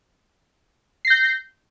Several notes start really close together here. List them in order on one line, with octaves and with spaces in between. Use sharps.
C7 A#6 G6